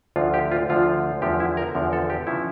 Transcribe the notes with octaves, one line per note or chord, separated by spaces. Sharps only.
D2 D3 F3 F4
G4
F4
D2 D3 F3 F4
E2 D3 F3 G4
E4
A#4
E2 D3 F3
A4
G4
C#3 F3 E4